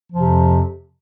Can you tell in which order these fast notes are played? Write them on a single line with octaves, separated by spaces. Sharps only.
F3 F2 C3